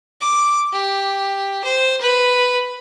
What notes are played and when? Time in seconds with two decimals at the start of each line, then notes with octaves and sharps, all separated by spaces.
0.21 D6
0.73 G4
1.64 C5
2.01 B4